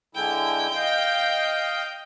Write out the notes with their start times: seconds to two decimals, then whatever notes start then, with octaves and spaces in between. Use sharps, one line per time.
0.15 D3 G#3 E4 G5
0.75 D#5 F5